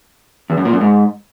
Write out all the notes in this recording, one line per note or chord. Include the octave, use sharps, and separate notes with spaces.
E2
F#2
A#2
F#2
G#2